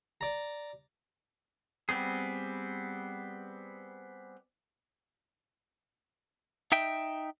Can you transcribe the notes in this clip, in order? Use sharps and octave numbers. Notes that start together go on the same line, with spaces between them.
D5 A#5
G3 B3 C4 G#4
D#4 E5 G5